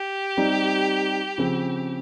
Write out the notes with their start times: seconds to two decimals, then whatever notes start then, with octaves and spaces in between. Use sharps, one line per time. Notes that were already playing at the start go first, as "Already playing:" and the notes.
Already playing: G4
0.37 G3 C4 D#4
1.38 C#3 F3 C4